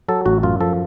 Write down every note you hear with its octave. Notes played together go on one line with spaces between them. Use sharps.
F#3 A4
A1 F#4
F#2 F4
F3 A4